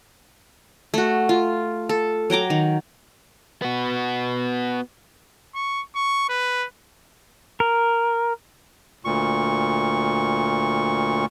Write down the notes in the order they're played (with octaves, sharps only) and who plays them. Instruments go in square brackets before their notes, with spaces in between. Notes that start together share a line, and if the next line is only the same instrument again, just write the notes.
[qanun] A3 F#4
F4
A4
F#3 G5 A#5 D6
D#3
[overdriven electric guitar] B3 F#4
[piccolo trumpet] C#6
C#6
B4
[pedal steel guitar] A#4
[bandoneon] D2 A#2 C#6